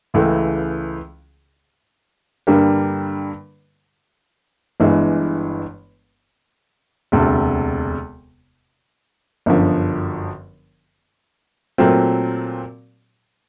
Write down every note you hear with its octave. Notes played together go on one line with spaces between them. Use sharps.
C#2 C#3 E3 A3
G2 D3 G3 A#3
G1 G2 E3 G#3
E1 D2 C3
G1 F#2 D3 F3
A#2 F#3 A3 C4 F4